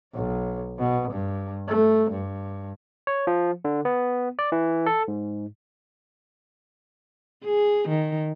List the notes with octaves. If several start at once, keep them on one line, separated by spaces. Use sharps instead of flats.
B1
B2
G2
A3
G2
C#5
F3
D3
B3
D5
E3
A4
G#2
G#4
D#3